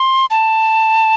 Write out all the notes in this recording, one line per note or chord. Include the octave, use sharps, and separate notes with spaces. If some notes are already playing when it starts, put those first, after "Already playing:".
Already playing: C6
A5